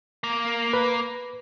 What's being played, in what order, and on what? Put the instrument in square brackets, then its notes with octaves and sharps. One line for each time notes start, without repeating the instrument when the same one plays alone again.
[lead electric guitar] A#3
[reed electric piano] B4